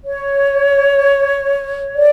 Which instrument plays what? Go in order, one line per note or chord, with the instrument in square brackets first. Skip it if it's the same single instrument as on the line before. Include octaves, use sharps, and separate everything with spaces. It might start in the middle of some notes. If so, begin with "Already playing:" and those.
[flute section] C#5
D5